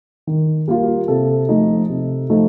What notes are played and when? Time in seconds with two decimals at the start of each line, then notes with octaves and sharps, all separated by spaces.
0.27 D#3
0.68 G3 A#3 F4
1.08 C3 A4
1.49 F3 A3 D#4
1.90 C3
2.30 F3 A3 D#4